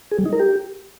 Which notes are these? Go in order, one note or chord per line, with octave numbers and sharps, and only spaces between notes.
G#4
G3
D#4
A#4
G4